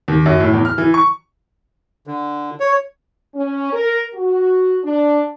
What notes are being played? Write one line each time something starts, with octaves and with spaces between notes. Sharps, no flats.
D#2
F#2
A2
E2
F6
E3
C#6
D3
C#5
C#4
A#4
F#4
D4